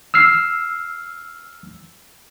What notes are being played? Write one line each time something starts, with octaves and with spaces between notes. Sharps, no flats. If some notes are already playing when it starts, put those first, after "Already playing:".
E6 F6 C7